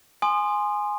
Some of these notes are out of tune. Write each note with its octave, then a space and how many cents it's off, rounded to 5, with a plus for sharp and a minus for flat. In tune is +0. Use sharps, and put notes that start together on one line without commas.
G#5 +0 C6 +0 D#6 -30